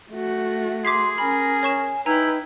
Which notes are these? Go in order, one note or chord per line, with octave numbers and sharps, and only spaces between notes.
A3 F#4
G#4 C6 D6 B6 C7
C#4 A#4 G#5 B5
C#5 C#6 E7
D#4 E4 B4 G5 G#5 A#5